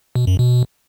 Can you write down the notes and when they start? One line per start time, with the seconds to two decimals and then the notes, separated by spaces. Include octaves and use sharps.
0.16 B2
0.27 F#2
0.39 B2